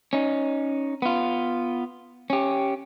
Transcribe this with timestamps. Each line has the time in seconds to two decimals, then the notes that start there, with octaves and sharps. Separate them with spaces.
0.13 C#4 D#4
1.02 B3 F4
2.30 C#4 G4